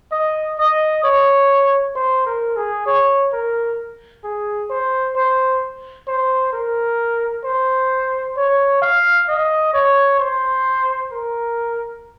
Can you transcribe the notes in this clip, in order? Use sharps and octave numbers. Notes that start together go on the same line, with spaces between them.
D#5
D#5
C#5
C5
A#4
G#4
C#5
A#4
G#4
C5
C5
C5
A#4
C5
C#5
F5
D#5
C#5
C5
A#4